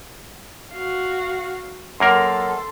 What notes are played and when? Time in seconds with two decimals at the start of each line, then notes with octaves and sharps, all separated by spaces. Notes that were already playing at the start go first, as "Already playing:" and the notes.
0.72 F#4 F5
2.00 F#2 A#3 A4 A#4 C6